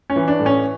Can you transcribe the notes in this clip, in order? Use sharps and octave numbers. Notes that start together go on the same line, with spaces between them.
C#4
E3
D4
A2
C#4